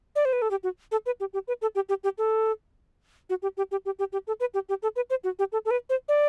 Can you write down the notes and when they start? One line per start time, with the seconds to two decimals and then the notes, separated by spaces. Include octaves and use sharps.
0.15 D5
0.25 C5
0.33 B4
0.42 A4
0.51 G4
0.63 F#4
0.92 A4
1.06 B4
1.20 G4
1.33 G4
1.48 B4
1.62 A4
1.75 G4
1.89 G4
2.04 G4
2.18 A4
3.30 F#4
3.42 G4
3.57 G4
3.71 G4
3.85 G4
3.99 G4
4.13 G4
4.27 A4
4.40 B4
4.54 G4
4.69 G4
4.83 A4
4.96 B4
5.10 C5
5.24 F#4
5.39 G4
5.52 A4
5.65 A4
5.71 B4
5.89 C5
6.08 D5